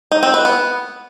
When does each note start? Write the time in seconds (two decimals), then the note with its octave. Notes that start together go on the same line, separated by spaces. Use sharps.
0.12 D#4
0.23 C4
0.34 B4
0.45 B3